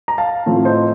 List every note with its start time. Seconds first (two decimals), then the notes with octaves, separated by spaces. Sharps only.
0.08 A#5
0.18 F5 A5
0.46 A2 F3 A3 C4
0.65 C5 D#5